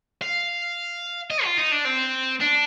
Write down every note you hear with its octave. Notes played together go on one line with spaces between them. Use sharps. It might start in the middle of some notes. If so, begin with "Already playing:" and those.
F5
D#5
F4
D#4
D4
C4
D4